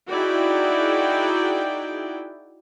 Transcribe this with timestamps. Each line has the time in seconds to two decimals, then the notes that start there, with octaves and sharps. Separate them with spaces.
0.10 D#4 E4 F#4 G#4 D5 G5